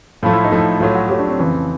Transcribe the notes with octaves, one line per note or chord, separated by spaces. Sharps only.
A2 F3 A3 F4
E4
D#4
A2 F3 A3 E4
A2 F#3 A3 F4
F#4
A2 F#3 A3 G4
D4
C4
F2 C#3 E3